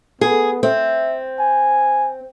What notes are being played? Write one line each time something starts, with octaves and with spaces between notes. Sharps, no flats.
B3 G#4
C4 E5
G#5